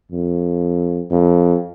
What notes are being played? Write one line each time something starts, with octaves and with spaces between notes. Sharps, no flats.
F2
F2